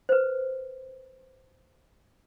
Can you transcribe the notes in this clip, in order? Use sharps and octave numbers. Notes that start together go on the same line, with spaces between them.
B4 C5